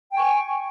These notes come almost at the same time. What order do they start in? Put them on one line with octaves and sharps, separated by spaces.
G5 G#5 C#6